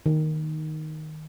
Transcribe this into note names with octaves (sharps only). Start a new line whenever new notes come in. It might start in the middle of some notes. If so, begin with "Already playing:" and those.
D#3